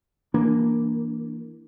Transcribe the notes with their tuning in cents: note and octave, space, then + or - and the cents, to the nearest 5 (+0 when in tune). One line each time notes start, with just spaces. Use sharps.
E3 +0 A#3 +0 D4 +0